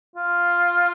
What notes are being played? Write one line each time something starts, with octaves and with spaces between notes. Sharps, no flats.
F4